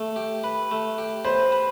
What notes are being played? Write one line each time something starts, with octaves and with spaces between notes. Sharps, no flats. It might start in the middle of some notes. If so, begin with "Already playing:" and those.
Already playing: A3
G4
B4
A3
G4
B4 C5
B4